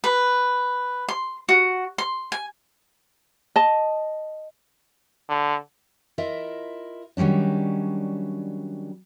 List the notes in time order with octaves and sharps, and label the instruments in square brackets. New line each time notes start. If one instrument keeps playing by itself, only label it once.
[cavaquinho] B4
C6
F#4
C6
G#5
[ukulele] D#5 A5
[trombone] D3
[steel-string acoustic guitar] E4 F4 A#4 D#5 E5
D#3 F#3 G3 C#4 D4